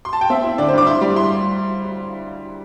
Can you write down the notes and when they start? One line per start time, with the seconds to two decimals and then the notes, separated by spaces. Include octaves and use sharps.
0.05 C6
0.13 A5
0.21 G5
0.30 C4 E5
0.44 E4
0.58 D3 D5
0.68 C5
0.73 G2 D6
0.87 E4 C6
1.01 G3
1.15 E4 C6